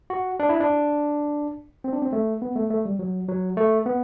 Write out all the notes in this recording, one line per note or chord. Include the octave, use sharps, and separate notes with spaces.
F#4
D4
E4
D4
C4
D4
C4
A3
B3
A3
A3
G3
F#3
F#3
A3
B3